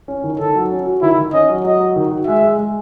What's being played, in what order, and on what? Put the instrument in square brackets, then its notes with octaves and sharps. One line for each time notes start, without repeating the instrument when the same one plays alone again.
[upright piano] C#4
D#3
[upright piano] D#3 [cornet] A4
[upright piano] F#3
C#4
F#4
[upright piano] D#3 [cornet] E4
[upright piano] D#3
[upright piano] C#4 [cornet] D#5
[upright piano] F#3
[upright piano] F#3 [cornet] D#5
[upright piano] F#3
D#3
F#4
[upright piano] G#3 [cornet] E5
[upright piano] G#3
G#3